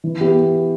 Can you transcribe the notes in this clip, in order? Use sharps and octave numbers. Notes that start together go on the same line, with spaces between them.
E3
B3 E4 G4